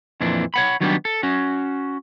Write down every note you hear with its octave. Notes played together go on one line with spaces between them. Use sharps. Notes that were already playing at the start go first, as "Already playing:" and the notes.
F2 A#2 E3 D4
C#5 F#5 B5
D#3 F#3 G3 B3 C4 D4
A4
C#4 F#4